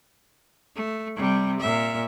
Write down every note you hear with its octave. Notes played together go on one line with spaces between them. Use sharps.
A3
C3 G3
A#2 E5